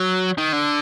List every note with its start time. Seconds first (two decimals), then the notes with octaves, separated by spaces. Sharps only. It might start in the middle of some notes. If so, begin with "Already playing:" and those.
Already playing: F#3
0.38 D#3
0.53 D3